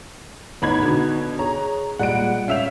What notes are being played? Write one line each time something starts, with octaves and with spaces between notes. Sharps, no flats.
A1 B3 D#4 B4 B5 G#6
B2 D3
G#4 C#5 A#5
A#2 G3 G#3 F#5 D7
C#4 E5 F5 E6 G6 F7